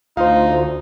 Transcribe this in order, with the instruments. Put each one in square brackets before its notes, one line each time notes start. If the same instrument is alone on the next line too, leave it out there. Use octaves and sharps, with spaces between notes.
[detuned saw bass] D2 [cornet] D#4 [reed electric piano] F4 C5 [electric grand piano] F5